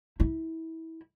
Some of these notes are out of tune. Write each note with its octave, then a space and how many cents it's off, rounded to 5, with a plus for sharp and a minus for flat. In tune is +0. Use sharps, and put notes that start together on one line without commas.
E4 -25